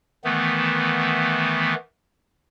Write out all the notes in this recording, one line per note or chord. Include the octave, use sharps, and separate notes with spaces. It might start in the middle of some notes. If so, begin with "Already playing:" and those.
D#3 E3 A3 B3